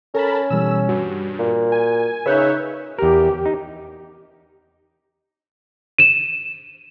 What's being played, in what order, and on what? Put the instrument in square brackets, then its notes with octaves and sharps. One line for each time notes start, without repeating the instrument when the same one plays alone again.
[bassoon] C#4 [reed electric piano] A4 [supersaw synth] A#4 A5 B5
[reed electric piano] B2 E3 G3 [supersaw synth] E6
[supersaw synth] G2 [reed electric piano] F#4
[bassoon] A#2
[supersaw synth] G#5
[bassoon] C#3 [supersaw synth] D#4 C#5 E5 [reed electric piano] B4 F#6 G6
[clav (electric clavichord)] E2 A#4 [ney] G4
[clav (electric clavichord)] D#4
[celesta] D#7 E7